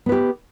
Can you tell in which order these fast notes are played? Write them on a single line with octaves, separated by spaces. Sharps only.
B3 B4 G4